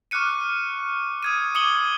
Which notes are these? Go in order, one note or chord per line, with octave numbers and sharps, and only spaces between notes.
C#6 D6 F6 F#6 C#7 D#7
D#6 G#6 D#7
D6 D#6 C#7 D#7 F#7 G7